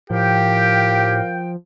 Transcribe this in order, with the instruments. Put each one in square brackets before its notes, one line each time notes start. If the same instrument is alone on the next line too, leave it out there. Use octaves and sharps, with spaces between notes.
[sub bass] A2 [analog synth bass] F3 [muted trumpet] G4 [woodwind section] A#4 F5 G5